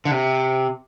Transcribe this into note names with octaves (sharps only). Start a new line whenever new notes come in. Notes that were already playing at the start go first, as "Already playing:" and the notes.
D3
C3